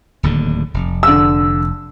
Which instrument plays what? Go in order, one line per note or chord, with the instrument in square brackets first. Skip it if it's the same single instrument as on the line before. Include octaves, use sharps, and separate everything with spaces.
[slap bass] D1 D#2 D3
F1
[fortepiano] D3 E6